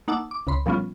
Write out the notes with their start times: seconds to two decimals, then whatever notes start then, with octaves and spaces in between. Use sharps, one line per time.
0.08 A#3 D#4 F#5 A5 D6 E6
0.31 D6
0.47 C#2 C#3 B5 C6
0.66 A#2 F3 G3 B3 C#4 F4